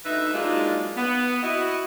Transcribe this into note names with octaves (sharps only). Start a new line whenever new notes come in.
D2 D#4 B4 E5
F#3 G#3 A#3 D4 D#4 F4
B3
E4 F#4 D#5